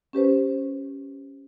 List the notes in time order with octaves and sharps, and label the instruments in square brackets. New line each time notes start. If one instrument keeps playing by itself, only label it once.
[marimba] C#4 G4 B4 C5